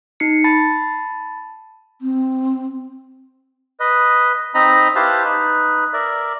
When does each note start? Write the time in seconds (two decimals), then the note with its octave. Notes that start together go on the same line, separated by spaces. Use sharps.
0.20 D#4 C7 C#7
0.44 A5 B5 A6
2.02 C4
3.80 B4 D#5
4.55 C4 D#4 D#5 A#5 B5
4.96 E4 G4 B4 C5 F5 A5
5.25 D#4 B4
5.93 A#4 D5 E5